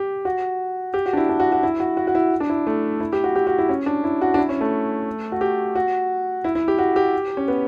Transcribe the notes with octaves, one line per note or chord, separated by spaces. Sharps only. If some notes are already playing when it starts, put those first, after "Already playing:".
Already playing: G4
F#4
G4
F#4
D4
E4
D4
F#4
F#4
E4
F#4
F#4
F#4
E4
D4
E4
A3
E4
G4
F#4
G4
F#4
E4
C#4
D4
E4
F#4
D4
E4
C#4
A3
F#4
G4
F#4
E4
E4
G4
F#4
G4
C#4
B3